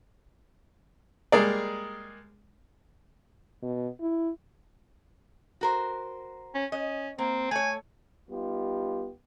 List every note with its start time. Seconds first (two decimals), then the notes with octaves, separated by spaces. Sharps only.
1.32 G3 G#3 A#3 G#4 A#4 D5
3.63 B2
4.01 E4
5.61 F#4 A#4 C5
6.55 C#4
6.72 C#4 D#5
7.19 A#3 C4
7.51 A3 C#5 G#5
8.30 G3 B3 D#4 F4 G4